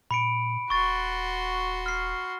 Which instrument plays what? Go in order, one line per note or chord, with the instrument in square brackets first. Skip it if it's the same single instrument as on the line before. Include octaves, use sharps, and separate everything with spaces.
[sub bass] A#2 [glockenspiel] B5 C#7 D7
[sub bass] D#1 [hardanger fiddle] F#4 C6 [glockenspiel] C#6 A6
[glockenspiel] F6 C7